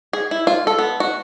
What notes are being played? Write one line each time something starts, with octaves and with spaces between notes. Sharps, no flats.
G#4
E4
F4
A4
B3
F#4